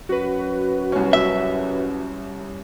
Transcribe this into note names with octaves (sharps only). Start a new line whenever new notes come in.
F#2 F#4 B4
C2 C#4
E5